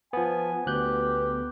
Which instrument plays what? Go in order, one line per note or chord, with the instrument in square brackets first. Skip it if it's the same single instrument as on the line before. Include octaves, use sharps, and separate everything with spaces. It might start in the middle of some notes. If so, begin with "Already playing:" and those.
[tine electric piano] F3 B3 [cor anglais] G#5
[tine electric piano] D2 F#6 G6 [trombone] B3 [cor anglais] G4